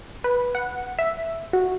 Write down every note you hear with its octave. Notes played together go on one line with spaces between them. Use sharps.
B4
F#5
E5
F#4